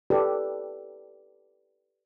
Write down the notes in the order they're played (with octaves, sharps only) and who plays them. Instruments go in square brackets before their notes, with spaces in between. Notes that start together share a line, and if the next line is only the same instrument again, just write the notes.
[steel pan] G4 A4 B4 D5